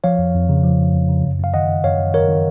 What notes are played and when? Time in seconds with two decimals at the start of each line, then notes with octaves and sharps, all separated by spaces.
0.04 F3 C#5 F5
0.19 F2
0.34 F2
0.49 C#3
0.64 F3
0.79 F2
0.94 F2
1.09 C#3
1.24 F#2
1.39 F#2 F5
1.54 D#3 D#5 F#5
1.69 D#3
1.84 F#2 C#5 F5
1.99 F#2
2.14 D#3 A#4 C#5
2.29 D#3